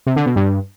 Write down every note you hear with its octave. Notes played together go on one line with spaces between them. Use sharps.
C3
D3
B2
G2